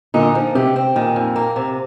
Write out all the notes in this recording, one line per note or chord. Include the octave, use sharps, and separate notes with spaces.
A#2 D3 D#4
F3
C3 G4
C4
A#2 D#3
F2
A#3
C3